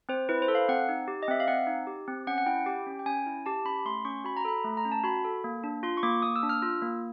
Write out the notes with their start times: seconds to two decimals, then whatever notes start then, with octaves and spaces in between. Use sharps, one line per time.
0.09 C4 C5
0.29 E4 B4
0.42 C5
0.48 A4
0.55 F5
0.68 C4 F#5
0.89 D#4
1.08 G4
1.23 D#5
1.28 C4 E5
1.40 F5
1.48 C4 F#5
1.67 D#4
1.87 G4
2.08 C4
2.27 C#4 F#5
2.38 F#5
2.46 E4 G5
2.66 G4 G5
2.87 C#4
2.99 G5
3.06 C#4 G#5
3.26 E4
3.46 G4 A5
3.65 C#4 B5
3.85 A3 C6
4.05 C#4 C#6
4.24 F#4 B5
4.37 A#5
4.45 A4 B5
4.64 A3
4.77 A#5
4.85 C#4
4.92 A5
5.04 F#4 B5
5.25 A4
5.44 A#3
5.64 D4
5.83 F4 C6
5.97 C#6
6.03 A#3 D6
6.22 A#3 D#6
6.36 E6
6.43 D4
6.49 F6
6.62 F4 E6
6.82 A#3